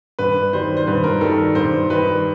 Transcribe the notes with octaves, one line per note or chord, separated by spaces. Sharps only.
G2 B4
D#3 G3 C5
C5
G2 B4
A#4
D#3 G3 A4
A#4
G2 C5
D#3 G3 B4